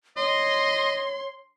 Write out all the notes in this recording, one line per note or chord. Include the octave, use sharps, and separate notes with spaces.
C#5 D#5 C6